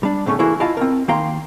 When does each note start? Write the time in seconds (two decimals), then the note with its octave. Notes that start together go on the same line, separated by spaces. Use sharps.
0.03 G3 D4
0.26 A2 C#3 A3 C#4
0.39 E3 A#3 E4 F#4 G#4 A4
0.60 E4 F4 D#5 F5 A5
0.77 C4 A#4
1.08 D#3 A#3 F5 G5 A#5 C6